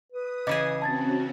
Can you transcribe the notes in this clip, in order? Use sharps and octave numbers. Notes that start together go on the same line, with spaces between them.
B4 D#6
C#3 E3 G#4 D#5 D6
C4 C#4 F#4 A5 G#6 A6